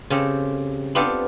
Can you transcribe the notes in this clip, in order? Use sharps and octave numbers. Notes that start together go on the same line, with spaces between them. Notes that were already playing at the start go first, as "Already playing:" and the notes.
C#3 C4 G4 A4
B3 C4 D4 F4 G4 A4